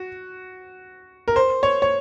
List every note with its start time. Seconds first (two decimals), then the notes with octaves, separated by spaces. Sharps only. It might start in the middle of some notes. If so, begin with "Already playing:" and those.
Already playing: F#4
1.28 A#4
1.36 C5
1.63 C#5
1.82 C#5